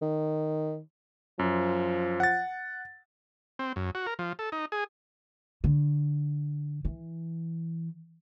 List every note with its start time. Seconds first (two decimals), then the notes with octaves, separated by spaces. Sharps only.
0.01 D#3
1.39 F#2 F3
2.20 F#5 A6
3.59 C4
3.76 F#2
3.95 F#4
4.07 A#4
4.19 F3
4.39 A4
4.52 D#4
4.72 G#4
5.64 D3
6.85 E3